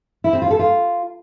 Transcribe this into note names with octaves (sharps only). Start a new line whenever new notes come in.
E4
C4
F4
A4
F4